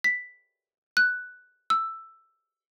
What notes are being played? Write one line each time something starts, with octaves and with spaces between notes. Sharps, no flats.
B6
F#6
E6